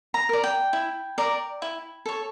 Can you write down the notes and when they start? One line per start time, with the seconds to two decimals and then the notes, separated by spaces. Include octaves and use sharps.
0.14 A#5
0.29 A#4 D5
0.44 G5
0.73 E4
1.18 A#4 D5
1.62 E4
2.06 A4 C#5